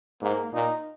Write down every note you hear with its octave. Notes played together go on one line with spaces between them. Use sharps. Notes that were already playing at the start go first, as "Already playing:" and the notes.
G#2 A#3
A#2 D#4